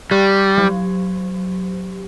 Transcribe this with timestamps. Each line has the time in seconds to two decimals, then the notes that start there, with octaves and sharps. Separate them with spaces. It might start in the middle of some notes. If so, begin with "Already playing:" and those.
0.11 G3 G4
0.58 F#3